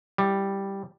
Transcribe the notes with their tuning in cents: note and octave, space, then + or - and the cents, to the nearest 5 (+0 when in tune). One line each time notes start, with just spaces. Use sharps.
G3 +0 E4 +0